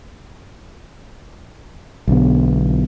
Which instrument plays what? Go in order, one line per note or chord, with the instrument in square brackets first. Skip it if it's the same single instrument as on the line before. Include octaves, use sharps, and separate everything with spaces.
[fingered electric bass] B1 D3 B3